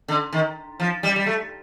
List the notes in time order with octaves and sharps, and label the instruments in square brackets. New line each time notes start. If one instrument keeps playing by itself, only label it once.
[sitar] D3
D#3
F3
G3
G3
A3